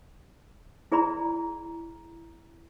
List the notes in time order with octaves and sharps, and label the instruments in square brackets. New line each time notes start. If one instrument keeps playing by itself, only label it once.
[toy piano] E4 G#4 D5 A#5 B5